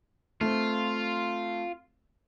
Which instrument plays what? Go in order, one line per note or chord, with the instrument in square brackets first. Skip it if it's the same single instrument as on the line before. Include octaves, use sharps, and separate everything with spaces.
[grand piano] A3 C4 [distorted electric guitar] F4